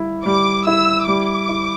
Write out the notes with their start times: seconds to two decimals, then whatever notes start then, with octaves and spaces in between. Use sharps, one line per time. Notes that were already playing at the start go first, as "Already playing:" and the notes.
Already playing: G3 E4
0.26 G3 D6
0.67 E4 E6
1.07 G3 D6
1.49 E4